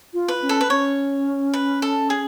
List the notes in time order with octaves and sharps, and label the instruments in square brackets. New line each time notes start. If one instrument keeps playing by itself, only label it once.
[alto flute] F4
[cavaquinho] B4
[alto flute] C#4
[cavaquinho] A4
B4
[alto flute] C#4 [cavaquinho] C#5
[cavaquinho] B4
A4
G#4